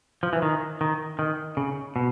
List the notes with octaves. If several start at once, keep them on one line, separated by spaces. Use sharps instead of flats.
F3
E3
D#3
D#3
D#3
C#3
B2